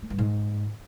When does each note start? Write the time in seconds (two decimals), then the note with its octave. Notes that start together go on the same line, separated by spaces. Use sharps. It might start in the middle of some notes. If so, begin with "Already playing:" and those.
0.02 A3
0.10 G2
0.18 G#2